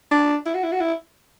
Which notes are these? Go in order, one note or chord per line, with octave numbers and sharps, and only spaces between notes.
D4
E4
F#4
E4
F#4
E4